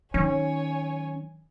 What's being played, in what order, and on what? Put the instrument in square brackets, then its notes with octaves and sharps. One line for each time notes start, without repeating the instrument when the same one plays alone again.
[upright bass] D#3 F#3 [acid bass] C#4 [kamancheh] C#5 G#5